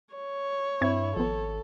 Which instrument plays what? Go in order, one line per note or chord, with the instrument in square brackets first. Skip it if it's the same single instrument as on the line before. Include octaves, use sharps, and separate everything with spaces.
[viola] C#5
[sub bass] G2 [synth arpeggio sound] C4 C#6 G#6 [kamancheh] E4
[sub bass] G#1 [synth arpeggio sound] F3 B3 [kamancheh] A4